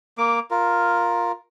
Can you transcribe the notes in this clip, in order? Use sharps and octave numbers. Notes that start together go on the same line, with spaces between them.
A#3 D6
F4 A#4